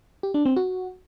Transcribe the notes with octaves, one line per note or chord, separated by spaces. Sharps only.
G4
D4
C4
F#4